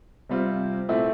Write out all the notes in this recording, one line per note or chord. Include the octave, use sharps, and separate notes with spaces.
C3 G3 C4 F4
A#2 A3 C4 E4